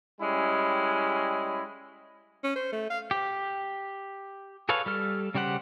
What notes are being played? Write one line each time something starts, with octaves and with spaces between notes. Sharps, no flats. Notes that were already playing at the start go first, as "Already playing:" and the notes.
G3 G#3 C#4 E4
C#4
C5
A3
F5
G4
G#4 A4 B4 C#5 F5
G3 A4 F6
C#3 G3 G4 C5 F#5